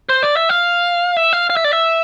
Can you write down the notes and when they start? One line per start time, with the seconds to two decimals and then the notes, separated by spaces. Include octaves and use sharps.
0.09 C5
0.23 D5
0.37 E5
0.49 F5
1.17 E5
1.33 F5
1.50 F5
1.57 E5
1.64 D5
1.73 E5